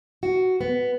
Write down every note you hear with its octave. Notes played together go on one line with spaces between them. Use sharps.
F#4
B3